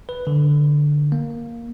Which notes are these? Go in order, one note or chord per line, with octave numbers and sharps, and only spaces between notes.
B4
D3
A#3